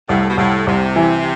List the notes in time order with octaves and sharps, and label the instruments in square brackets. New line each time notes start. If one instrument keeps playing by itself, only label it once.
[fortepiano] C2 [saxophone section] A2
[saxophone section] B2
[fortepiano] C2 [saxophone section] A2
[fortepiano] C2 [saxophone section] C3
[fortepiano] E3